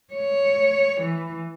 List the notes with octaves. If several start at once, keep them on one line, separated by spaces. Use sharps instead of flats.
C#5
E3